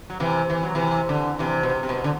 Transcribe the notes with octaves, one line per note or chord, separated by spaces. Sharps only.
F#3
C3 E3
E3
F#3
C3 E3
D3
C3 E3
B2
C3
C3
B2
D3